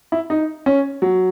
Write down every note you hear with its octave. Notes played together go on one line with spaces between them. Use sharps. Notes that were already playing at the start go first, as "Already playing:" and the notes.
E4
D#4
C#4
F#3